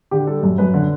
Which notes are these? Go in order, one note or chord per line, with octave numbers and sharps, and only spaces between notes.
D3 G4
G3 A4
F#2
F#2 B4
D3